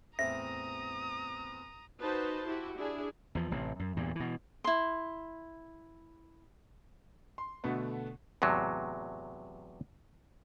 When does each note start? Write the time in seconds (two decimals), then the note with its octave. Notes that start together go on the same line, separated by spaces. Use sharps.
0.19 E2 A2 C4 E5 A#5 D#6 A#6
1.99 D#4 F#4 B4 C5 A5
2.46 E4 F#4 G4
2.77 D4 E4 G#4
3.35 E2 F3
3.51 A1 C3
3.79 F#2
3.97 E2 G2 A#2
4.16 B2 E3
4.64 E4 C6
7.38 C6
7.64 B2 D3 A3 B3
8.42 E2 A2 C3 F#3